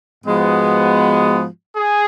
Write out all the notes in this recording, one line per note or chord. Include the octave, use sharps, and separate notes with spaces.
G#2 F3 G#3 B3 F#4
G#4